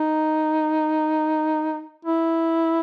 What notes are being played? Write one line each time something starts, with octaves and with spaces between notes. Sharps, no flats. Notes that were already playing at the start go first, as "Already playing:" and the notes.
Already playing: D#4
E4